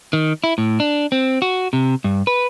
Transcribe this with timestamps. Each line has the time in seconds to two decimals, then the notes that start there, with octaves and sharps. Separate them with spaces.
0.13 D#3
0.44 E4
0.58 A2
0.80 D4
1.12 C4
1.42 F#4
1.73 C3
2.04 G2
2.27 B4